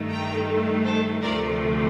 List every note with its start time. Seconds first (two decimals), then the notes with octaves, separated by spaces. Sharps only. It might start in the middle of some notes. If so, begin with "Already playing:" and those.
Already playing: G2 D#3 A3
0.10 G5 A#5
0.84 A4 C5
1.22 D2 C3 F3 A3 A#4 D5